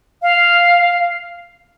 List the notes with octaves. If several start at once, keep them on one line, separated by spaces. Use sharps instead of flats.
F5